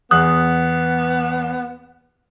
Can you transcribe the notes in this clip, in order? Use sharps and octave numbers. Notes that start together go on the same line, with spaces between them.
E2 B3 D#6 F#6